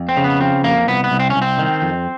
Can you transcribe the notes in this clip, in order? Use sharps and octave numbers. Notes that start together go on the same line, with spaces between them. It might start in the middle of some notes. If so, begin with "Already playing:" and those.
Already playing: F2
C4
C#3
B3
F3 C4
F2 A#3
C2 B3
B3
C2
C4
C#4
C2
C4
D#3
F2